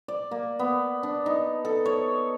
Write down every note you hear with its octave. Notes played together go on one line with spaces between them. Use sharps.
D5
A#3
B3
D4
D#4
A4
C#5